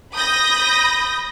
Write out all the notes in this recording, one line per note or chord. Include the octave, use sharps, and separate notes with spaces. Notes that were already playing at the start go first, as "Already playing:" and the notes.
B5 D#6 G6 A#6